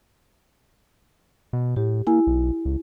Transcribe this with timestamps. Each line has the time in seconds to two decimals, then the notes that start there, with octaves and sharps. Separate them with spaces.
1.53 B2
1.76 A2 G4
2.07 A#3 E4 G#5
2.27 B1
2.65 C#2